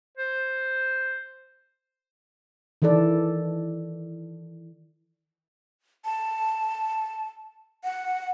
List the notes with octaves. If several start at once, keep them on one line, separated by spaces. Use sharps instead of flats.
C5
D#3 E3 E4 A4 D5
A5
F#5